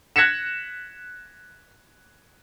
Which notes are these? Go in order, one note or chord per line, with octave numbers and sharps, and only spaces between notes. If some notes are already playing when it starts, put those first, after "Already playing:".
F#6 G#6 A#6 B6 C#7 E7